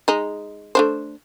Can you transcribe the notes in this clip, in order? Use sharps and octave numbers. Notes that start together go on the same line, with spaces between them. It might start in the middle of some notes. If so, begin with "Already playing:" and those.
G#3 D#4
A3 D4 C5